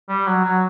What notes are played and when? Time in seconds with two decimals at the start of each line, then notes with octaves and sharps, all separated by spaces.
0.09 G3
0.27 F#3
0.44 F#3